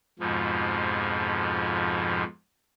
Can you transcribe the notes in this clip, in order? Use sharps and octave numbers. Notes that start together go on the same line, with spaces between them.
F2 G#2 B2 F3